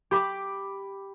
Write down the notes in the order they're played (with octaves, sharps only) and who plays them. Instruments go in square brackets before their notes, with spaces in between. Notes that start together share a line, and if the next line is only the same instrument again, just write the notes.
[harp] G4 B5 D6